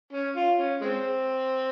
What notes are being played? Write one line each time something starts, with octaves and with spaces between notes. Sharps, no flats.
C#4
F4
C#4
G#3 C4